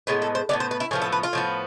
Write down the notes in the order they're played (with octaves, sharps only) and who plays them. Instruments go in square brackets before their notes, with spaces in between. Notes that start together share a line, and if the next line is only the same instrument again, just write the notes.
[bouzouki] A2 G#3 B3 B4
A4
C5
A2 G#3 B3 D5
C5
B4
E4
A2 F3 B3 G#4
A4
B4
F4
A2 F3 B3